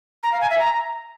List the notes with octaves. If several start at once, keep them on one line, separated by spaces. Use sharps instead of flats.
A#5
F5
G#5
E5
A#5